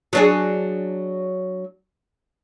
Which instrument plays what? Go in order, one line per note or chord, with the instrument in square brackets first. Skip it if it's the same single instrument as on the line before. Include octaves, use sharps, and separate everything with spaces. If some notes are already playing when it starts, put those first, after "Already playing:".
[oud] F#3 D4 G#4